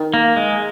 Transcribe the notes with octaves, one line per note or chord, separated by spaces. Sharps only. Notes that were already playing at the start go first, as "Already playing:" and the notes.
Already playing: D#3
A#3
G#3